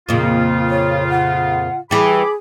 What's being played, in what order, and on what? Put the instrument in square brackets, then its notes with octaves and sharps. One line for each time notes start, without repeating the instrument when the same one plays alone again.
[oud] F2 A#2 [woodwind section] C#3 F4
[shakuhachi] C#5
F#5
[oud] E3 G3 [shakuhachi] G#4 [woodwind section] B5 D6